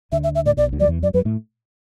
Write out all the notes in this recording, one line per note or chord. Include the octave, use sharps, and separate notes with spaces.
D2 D3 E5
E5
E5
A2 D5
B1 B2 D5
D2 D3
F#3 D5
E2 E3
F#2 F#3 D5
F#2 F#3 B4
A2 A3